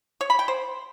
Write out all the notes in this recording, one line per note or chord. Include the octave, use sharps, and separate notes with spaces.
C#5
B5
G5
C5